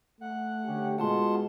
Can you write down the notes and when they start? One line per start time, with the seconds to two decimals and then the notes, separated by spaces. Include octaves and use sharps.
0.21 A3 F#5
0.66 D3 C#4 G4
0.98 B2 G#3 F4 F#5 A5 C6